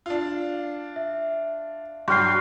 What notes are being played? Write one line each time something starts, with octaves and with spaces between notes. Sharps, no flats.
D4 F4
E5
G2 F#3 F#4 G5 C6 F6 C7